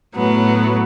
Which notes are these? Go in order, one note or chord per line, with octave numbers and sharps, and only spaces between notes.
A2 F#3 B3